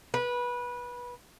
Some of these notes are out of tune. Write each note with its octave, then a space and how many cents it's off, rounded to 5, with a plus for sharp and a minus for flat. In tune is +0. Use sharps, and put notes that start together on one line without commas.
B4 -20